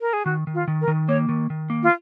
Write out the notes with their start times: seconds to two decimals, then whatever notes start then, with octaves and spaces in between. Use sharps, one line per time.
0.01 A#4
0.13 G#4
0.26 D#3 F#4
0.47 D#3
0.54 F4
0.68 D#3
0.81 A#4
0.88 D#3
1.09 A#3 C#5
1.29 D#3
1.50 D#3
1.70 A#3
1.83 F4